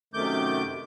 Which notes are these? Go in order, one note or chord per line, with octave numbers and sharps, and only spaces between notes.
F#2 C3 D#3 A3 D6 G6